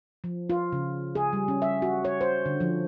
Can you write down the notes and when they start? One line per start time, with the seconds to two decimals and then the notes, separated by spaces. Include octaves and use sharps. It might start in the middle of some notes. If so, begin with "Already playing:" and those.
0.24 F3
0.50 F4
0.72 C#3
1.15 G#4
1.33 G3
1.48 C#4
1.62 E5
1.82 F#4
2.05 C#5
2.21 C5
2.46 D3
2.60 F3